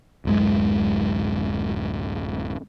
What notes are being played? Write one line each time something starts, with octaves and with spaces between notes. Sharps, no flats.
D1 F#2 G#3